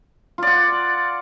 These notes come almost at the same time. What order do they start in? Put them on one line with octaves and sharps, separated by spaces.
F4 D5 F#5